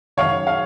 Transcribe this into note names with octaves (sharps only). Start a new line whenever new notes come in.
F#2 D#3 C#5 F5
F5